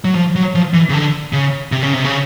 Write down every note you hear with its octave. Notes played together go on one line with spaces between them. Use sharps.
F#3
F3
F#3
F3
E3
C#3
D3
C#3
C3
C#3
C3
C#3